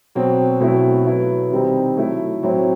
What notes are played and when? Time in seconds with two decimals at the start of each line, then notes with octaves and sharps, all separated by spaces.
0.15 B2 F#3 C4
0.60 B2 F#3 A3 C4 E4
1.06 F#3 B3 E4
1.51 C3 D#3 G3 C4 D#4
1.97 F#3 A3 E4
2.43 A2 F#3 C4 E4